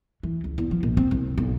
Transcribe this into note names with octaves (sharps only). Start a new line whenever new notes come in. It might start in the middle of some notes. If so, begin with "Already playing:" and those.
E3
C#2
E2
F3
A#1
C4
C2
B1